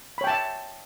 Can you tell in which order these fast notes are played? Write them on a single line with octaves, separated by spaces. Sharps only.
B5 C#5 G5 A5 E5